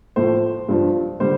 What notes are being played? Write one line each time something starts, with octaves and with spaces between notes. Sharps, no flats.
A2 F3 C5
G2 F3
D3 G3 C5